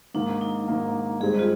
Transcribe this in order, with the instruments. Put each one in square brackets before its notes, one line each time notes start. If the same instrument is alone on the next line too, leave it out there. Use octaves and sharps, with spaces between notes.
[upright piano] G#2 D#3 A#3 [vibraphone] D4
[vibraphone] D#4
[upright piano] G#2 D#3 A#3
[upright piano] G2 D#3 G#3 C4 [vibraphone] G#4
[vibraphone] F4